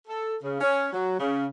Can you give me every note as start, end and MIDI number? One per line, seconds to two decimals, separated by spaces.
0.08 0.37 69
0.42 0.59 49
0.61 0.88 61
0.93 1.16 54
1.19 1.47 49